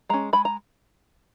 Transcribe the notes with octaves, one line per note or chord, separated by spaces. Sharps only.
G#3 C#4 A#5
G#3 B5
A#5